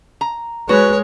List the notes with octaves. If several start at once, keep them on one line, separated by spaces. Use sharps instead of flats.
A#5
G#3 F#4 B4 C#5